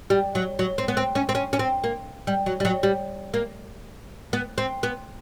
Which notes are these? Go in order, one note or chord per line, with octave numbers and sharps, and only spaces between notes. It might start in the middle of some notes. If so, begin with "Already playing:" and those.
G3
F#3
F#3
C4
B3
C4
C#4
C4
C#4
C#4
C4
A#3
G3
F#3
G3
F#3
G3
A#3
B3
C4
B3